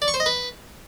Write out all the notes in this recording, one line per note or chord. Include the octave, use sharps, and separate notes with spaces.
D5
C#6
C5
D#5
B4